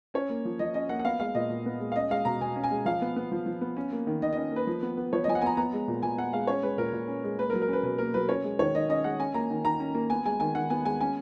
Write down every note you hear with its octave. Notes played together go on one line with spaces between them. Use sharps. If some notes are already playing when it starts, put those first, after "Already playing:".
C#4 C#5
A#3
F3
F3 D#5
C#4 D#5
A#3 F#5
F#5
B3 F5
G#3 F5
A#2 D#5
A#2
B3
G#3
F5
C#4 D#5
G#3 F5
B2 A#5
B2 G#5
C#4
G#5
G#3
F3 F5
B3
B3
F3
F3
B3
C#4
A#3
D#3
D#3 D#5
D#5
C#4
A#3 B4
F3
B3
B3
F3 C#5
D#5
F3 G#5
F#5
B3 G#5 A#5
B3 A#5
G#3
A#2
A#2 G#5
B3 F#5
G#3 F5
C#4 C#5
G#3 B4
A#2 A#4
A#2
C#4
G#3
A#3 B4
A#4
F#3
A#4
C#4 B4
B2 B4
A#3 A#4
F#3 B4
C#4 C#5
G#3
D#3 C#5
D#3 D#5
C#4 D#5
G#3 F#5
C#4 G#5
A#3 A#5
D#3
D#3 A#5
C#4
A#3
B3 G#5
G#3 G#5
D#3 G#5
D#3 F#5
B3 G#5
G#3 G#5
C#4 G#5